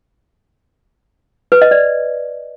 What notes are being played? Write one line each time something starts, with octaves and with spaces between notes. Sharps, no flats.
B4
D#5
D5